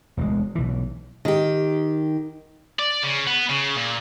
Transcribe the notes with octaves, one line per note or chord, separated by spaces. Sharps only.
E1 D2 E3 G#3
B1 E3
D#3 G4
D5
C#3
B3
C#3
A#2